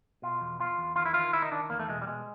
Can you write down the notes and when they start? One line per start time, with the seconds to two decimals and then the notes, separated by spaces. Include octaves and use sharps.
0.22 B2 F4
0.41 E2
0.60 E2 F4
0.78 E2
0.96 D#3 F4
1.06 E4
1.14 D#3 F4
1.33 D#3 E4
1.42 D#4
1.51 D#3 D4
1.70 E2 A#3
1.79 A3
1.89 B2 G#3
2.02 G3
2.07 B2 G#3